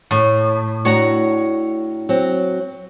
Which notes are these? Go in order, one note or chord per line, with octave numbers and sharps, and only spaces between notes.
A2
A2 D4 F#4 C#5 A#5
F#3 C4